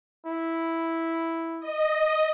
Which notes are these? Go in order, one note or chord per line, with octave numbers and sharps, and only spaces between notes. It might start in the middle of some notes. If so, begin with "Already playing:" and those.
E4
D#5